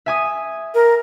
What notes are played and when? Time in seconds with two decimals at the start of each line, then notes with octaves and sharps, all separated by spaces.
0.06 E5 G#5 D#6
0.74 A#4